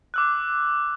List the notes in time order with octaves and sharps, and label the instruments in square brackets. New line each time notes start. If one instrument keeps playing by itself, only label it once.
[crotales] D6 E6 F#6